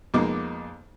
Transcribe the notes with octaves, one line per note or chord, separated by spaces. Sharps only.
F2 G#3 A#3 B3 D#4 D6